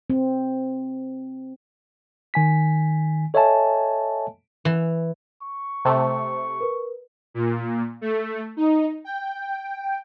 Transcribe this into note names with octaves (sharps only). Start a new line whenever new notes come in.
C4
D#3 G#5 B6
A4 C#5 D#5 E5 G#5 A5
E3
C#6
C3 A3 C5
A#4 B4
A#2
A3
D#4
G5